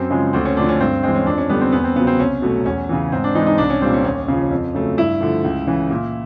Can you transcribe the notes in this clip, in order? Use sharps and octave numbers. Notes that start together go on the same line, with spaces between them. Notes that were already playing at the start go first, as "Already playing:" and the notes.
Already playing: F#2 C4
C#3 F3 G#3
D2 C4
C#4
D3 F3 A3 D4
C#4
G2 C4
E3 G#3 C4
C#4
F2 D4
C#4
D3 G3 B3
C4
E2 B3
C4
C#3 F#3 B3
C4
C2 C#4
B2 F#3 A3
E2 C#4
C#3 E3
G#2 C4
D4
E3 G#3 D#4
D#4
C2 D4
C#4
A#2 G3 C4
C#4
D#2 C#4
C#3 F3
F2
C#3 F#3 A3
G2 E4
D3 F3 A3
C#2
C#3 E3
A#2